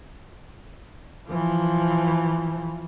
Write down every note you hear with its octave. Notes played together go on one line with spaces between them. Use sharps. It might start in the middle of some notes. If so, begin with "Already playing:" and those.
E3 F3